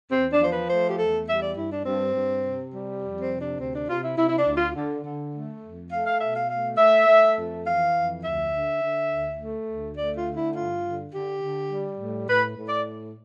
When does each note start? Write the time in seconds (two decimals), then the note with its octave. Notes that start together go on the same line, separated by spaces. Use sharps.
0.11 E2 C4
0.31 D4
0.41 F3 C5
0.51 B4
0.70 A3 C5
0.88 G4
0.99 E2 A4
1.27 G3 E5
1.42 D5
1.57 G2 E4
1.71 D4
1.85 G2 C4
2.15 G2
2.44 C3
2.73 G3
3.01 F2
3.21 C4
3.30 C3
3.41 D4
3.59 D2 C4
3.74 D4
3.88 C3 F4
4.03 E4
4.17 C3 E4
4.28 E4
4.37 D4
4.46 D2
4.56 F4
4.75 D3
5.04 D3
5.34 A3
5.62 F2
5.91 A3 F5
6.06 F5
6.20 B2 E5
6.34 F5
6.49 A3 F5
6.78 A3 E5
7.07 A3
7.36 F2
7.65 E3 F5
7.94 F2
8.23 D2 E5
8.52 D3
8.81 D3
9.10 D2
9.39 A3
9.68 D2
9.96 A3 D5
10.16 F4
10.26 D3
10.35 E4
10.55 G2 F4
10.83 D3
11.13 D3 G4
11.42 D3
11.71 G3
12.00 A2
12.28 A2 B4
12.57 A2
12.67 D5